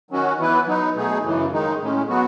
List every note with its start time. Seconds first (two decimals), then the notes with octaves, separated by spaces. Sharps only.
0.11 D#3 F#3 C#4 F#4
0.39 E3 B3 E4 B4
0.67 F#3 B3 D#4
0.95 B2 A3 D#4 G#4
1.24 F#2 C#3 E3
1.52 D#3 G#3 D#4
1.80 A2 G#3 C#4
2.09 F#3 B3 F#4